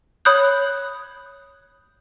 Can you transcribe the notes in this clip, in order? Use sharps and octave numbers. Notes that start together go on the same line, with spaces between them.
C#5 B5 D#6 F#6 G6